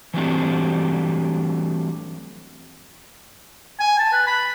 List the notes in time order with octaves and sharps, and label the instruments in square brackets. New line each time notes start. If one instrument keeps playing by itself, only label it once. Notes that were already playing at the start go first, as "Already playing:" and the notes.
[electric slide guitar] E3 F#3 G3 A3 C4 D4
[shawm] G#5
A5
B4
B5